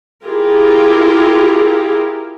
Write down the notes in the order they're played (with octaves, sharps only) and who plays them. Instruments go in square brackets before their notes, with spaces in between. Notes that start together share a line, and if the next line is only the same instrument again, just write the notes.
[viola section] E4 F4 G4 G#4 A#4